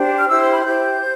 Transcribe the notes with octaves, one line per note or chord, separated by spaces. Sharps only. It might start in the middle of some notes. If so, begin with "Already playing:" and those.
Already playing: D4 G4 C5
F6
E4 G4 C5 E6
C6
B5
E4 G4 C5 G6
C5